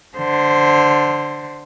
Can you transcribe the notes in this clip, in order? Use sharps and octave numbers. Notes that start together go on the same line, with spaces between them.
D3 C5